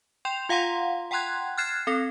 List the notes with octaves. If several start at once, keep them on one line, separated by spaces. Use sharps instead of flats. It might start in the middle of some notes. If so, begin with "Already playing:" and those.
G5 C6 G6 E7 F7
F4 F5 F#5 A#5 C6
F#5 G5 A#5 C6 F#6 G#6
F6 F#6 G#6 A6 C7 E7
C4 A4 A#6